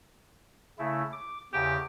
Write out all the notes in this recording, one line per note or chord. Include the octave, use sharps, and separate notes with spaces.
C#3 A3 E4
D6
E2 C#3 G4